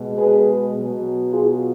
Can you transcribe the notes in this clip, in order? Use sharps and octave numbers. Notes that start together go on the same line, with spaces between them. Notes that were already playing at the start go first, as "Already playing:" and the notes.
Already playing: B2 G#3
G#4 B4
B2 F#3
F4 G#4